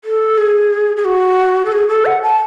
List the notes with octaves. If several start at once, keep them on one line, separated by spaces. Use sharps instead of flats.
A4
G#4
G#4
F#4
A4
G#4
A4
F#5
A5